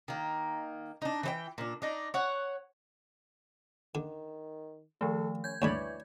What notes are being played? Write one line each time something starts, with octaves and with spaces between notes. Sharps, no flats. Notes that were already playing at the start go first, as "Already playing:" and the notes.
D#3 A#3
D4 D#4
E3 C5 G5
A#2 D4
D4 D#4 D5
C#5 F#5
D3 D#3
D#3 F3 A3 A4
C#4 G6 G#6
D2 G2 D3 E3 C#5 D5 B5